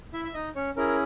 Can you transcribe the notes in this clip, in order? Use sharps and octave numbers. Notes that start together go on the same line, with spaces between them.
E4 E5
E5
D#4 D#5
C#4 C#5
C#4 E4 G#4 A#4